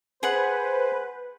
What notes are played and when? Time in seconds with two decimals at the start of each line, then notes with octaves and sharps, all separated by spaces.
0.23 G#4 B4 C5 F#5